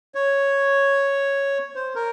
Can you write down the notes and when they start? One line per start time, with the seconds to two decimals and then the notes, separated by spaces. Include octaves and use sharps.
0.15 C#5
1.75 C5
1.95 A#4